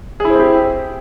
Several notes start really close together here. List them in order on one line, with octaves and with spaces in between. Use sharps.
G#4 E4 C5 C4 G4